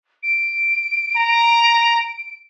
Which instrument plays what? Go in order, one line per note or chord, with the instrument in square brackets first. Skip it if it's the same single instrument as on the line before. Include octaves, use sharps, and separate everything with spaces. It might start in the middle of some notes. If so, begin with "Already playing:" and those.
[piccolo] D7
[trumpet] A#5